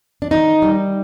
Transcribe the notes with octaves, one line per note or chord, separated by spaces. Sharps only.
D4
D#3 D#4
G3